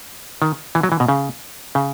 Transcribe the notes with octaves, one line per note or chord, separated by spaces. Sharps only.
D#3
E3
F#3
E3
B2
C#3
C#3